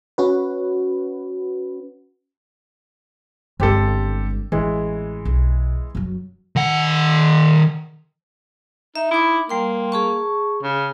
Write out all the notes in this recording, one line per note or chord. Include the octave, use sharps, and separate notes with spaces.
C#4 F#4 B4
G1 G#3 C4 G4 A4
A1 E3 G#3
B1
F#2 F#3
D#3 F#5
D#4 E5
D#4 E4 D6
G3 A#3 G5 C6
G#4 A5 C#6
C#3